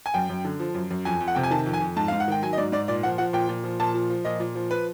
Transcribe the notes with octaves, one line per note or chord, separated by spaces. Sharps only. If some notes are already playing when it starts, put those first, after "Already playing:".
G#5
F#2 G5
F#2
D3
F3
F#2
F#2
F2 G#5
F2
F#5
C3 G5
G#5
D#3 A5
F2
G#5
F2
G#2 A5
G#2 F5
F#5
D#3 G5
F#3 G#5
D#5
G#2 D5
G#2 D5
A#2 D5
F3 F#5
F3 F#5
A#2 G5
A#2
F3
A#2 A5
F3
F3
A#2 D#5
A#2
F3
B4